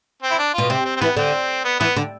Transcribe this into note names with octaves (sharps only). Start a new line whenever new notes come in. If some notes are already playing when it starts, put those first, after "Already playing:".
C4
E4
D4
B2 F4
C3 C4
C4
C4
E3 B3
D3 C4
B3
E3 B3
D3